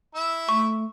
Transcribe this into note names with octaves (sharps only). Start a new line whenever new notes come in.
E4 E6
A3 C#6